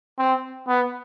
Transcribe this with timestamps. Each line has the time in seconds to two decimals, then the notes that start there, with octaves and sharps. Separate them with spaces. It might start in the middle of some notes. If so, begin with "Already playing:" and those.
0.18 C4
0.67 B3